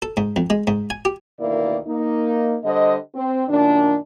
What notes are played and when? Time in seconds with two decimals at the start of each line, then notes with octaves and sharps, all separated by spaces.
0.02 A4
0.17 G#2
0.36 F2
0.50 G#3
0.67 G#2
0.90 G#5
1.05 G4
1.40 D2 B2 D#3 A#3 E4 D5
1.87 A#3 D#4
2.64 D3 G3 C5 D#5
3.15 C4
3.48 F#2 A#2 D#3 D4